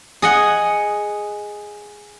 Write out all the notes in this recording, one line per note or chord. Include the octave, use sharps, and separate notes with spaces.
G#4 D#5 F#5